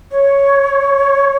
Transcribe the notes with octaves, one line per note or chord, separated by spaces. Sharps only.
C#5